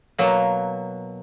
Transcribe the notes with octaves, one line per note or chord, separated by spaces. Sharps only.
B2 F#3 A#3